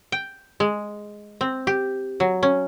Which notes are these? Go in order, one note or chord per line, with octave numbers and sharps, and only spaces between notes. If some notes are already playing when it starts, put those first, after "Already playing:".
G5
G#3
C4
G4
F#3
C#4